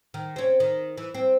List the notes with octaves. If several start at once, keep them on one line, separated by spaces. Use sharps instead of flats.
D#3
C4 C#4
D#3
E3
C4